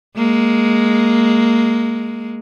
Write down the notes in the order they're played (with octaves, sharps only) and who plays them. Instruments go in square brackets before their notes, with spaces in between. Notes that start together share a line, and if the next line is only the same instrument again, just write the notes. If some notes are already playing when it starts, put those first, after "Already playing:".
[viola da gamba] G#3 A#3